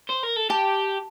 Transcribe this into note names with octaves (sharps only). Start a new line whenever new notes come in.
C5
A#4
A4
G4 A5